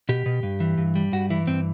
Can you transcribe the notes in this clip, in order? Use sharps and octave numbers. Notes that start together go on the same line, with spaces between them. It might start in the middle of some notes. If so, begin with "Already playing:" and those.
B2 G4
B2
G2
E3
G2
G3
G2 F#4
E3 E4
G2 C4